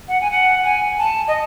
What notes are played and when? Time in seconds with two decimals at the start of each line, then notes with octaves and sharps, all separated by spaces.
0.08 F#5
0.21 G#5
0.31 F#5
0.65 G#5
0.98 A5
1.28 D#5